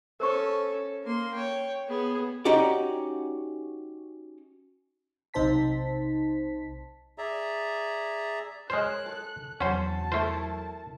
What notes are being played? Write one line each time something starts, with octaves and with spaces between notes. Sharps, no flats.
C#4 A4 A#4 C5 C#6
A#3 C6
C#5 G5
B3 G#4
C#4 D#4 F#4 G4 D5
B1 C3 D#4 C5 A5 B6
G#4 D5 E5 A#5
G#3 A#4 C5 C#5 F#6
A4
E2 F#3 C#4 C5 F#5 A5
A3 E4 A4 A#4 C5